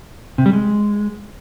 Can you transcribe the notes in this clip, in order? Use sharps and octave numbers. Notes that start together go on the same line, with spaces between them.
C3
G3
G#3